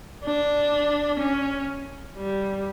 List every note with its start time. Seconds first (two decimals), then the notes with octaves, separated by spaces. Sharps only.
0.24 D4
1.20 C#4
2.17 G3